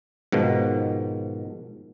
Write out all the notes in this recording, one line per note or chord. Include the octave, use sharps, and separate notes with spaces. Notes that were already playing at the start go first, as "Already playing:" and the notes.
G#2 B2 D#3 F3